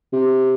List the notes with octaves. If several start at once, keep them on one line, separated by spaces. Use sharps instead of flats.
C3